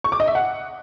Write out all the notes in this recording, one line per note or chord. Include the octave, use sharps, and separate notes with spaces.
C#6
D6
D#5
E5
F#5